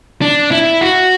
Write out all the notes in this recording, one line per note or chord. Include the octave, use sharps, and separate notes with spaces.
D4
E4
F#4